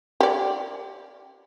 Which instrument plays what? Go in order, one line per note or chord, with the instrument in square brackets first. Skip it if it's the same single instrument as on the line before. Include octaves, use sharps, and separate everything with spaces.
[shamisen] G4 D5